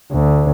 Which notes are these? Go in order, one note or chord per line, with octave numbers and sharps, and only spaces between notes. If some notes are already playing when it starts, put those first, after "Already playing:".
D2